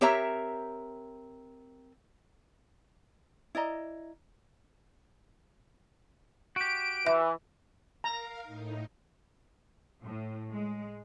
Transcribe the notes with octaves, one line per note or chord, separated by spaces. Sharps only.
C4 G4 A#4 C#5 E5 A#5
E4 D5 D#5 A#5
F#4 G4 D7
E3 E5
A#4 F5 A#5
A2 D#4
A2
G#3